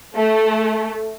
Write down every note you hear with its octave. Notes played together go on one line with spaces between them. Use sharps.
A3